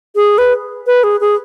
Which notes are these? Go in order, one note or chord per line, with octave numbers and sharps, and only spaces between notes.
G#4
B4
B4
G#4
G#4